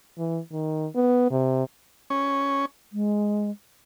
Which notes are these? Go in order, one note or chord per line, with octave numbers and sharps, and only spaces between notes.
E3
D#3
B3
C3
C#4
G#3